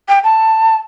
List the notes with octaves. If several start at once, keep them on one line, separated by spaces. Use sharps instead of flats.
G5
A5